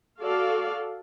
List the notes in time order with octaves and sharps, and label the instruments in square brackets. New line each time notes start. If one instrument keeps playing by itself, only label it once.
[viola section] F#4 A4 D5 F5